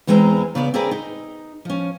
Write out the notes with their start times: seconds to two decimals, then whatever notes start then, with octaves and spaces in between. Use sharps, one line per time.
0.07 E2 E3 G#3 C4 G#5 A#5
0.55 C#3 B3 D5
0.74 C4 D4 G#4 A#4 B4 D5
0.91 D#4
1.65 F3 C#4